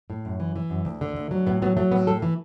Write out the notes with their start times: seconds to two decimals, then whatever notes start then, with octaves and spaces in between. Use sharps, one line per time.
0.10 A2
0.25 F#2
0.40 E3
0.56 E3
0.70 F#2
0.85 D2
1.01 D3
1.16 D2
1.31 F#3
1.46 A2 B3
1.62 F#3 B3
1.77 F#3 A3
1.92 A2 B3
2.07 A2 A4
2.22 E3